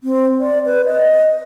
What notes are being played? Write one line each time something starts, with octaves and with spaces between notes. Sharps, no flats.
C4
D5
B4
D#5